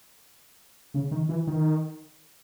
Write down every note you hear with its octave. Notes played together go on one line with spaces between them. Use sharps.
C#3
D#3
E3
D#3